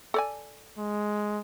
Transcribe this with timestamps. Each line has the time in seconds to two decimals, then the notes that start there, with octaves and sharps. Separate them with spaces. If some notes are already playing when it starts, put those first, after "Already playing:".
0.14 A4 D5 G#5
0.78 G#3